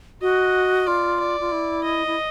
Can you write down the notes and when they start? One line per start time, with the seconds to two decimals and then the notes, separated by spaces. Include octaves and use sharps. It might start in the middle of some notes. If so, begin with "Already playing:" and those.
0.22 F#4 D#5
0.87 F4 D5
1.20 D5
1.40 F4
1.52 E4
1.84 D#5
2.07 E4